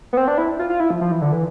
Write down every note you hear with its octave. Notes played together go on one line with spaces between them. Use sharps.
B3
C4
D4
E4
F4
F4
E4
F3
F3
E3
D3
E3